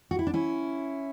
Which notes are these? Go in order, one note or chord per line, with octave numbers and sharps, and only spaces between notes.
F#4
E4
D4
C#4 E4